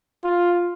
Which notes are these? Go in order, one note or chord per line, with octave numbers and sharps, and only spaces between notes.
F4